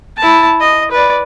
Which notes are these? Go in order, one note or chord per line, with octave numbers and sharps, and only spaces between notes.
E4 A5
D#5
B4 D5